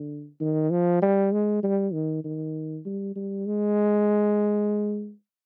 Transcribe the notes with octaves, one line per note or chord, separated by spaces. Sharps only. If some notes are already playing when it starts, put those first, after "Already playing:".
Already playing: D3
D#3
F3
G3
G#3
G3
D#3
D#3
G3
G3
G#3